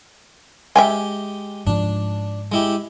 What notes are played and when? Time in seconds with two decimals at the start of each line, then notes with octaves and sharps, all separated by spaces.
0.76 G#3 G4 E5 G5 G#5
1.67 G#2 F3 D4
2.52 G#3 E4 G4